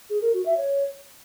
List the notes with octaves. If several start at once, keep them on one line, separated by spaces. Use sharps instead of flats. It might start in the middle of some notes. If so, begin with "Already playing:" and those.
G#4
A#4
F#4
E5
C#5